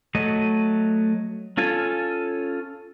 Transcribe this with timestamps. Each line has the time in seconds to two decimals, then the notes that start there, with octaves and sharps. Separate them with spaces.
0.15 F#3 A3 D#5
1.57 C#4 F4 A4 G#5